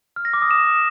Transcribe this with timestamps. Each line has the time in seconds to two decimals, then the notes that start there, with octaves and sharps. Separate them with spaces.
0.16 F6
0.25 A#6
0.34 D6
0.42 D#6
0.51 E7